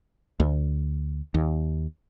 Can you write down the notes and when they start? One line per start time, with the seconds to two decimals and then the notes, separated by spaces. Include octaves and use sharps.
0.40 D2
1.34 D#2